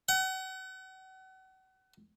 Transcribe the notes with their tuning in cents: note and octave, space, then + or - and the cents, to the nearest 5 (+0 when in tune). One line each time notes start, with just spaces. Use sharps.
F#5 +35